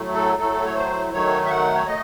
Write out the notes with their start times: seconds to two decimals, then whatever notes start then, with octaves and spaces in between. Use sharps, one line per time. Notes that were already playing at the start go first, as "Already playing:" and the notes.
Already playing: A2 F#3 A3
0.14 A4
0.39 A2 F#3 A3 A4
0.65 C#5
0.76 C5
1.13 D#3 F#3 A3 C#5
1.45 E5
1.50 F#5
1.75 C#5
1.87 A3 D#5